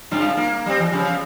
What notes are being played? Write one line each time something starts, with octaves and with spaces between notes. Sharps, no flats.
G2 C#3 F4
A#3
G3 C4
E2
C#3 F3